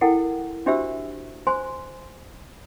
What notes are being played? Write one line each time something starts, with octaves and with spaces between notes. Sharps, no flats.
E4 A4 A#4 F#5 G5
D4 F#4 G4 C5 E5 E6
C5 G#5 C6